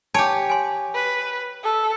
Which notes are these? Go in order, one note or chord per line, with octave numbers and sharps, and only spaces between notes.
G4 C#5 G#5 A5
G#5 C6
B4
A4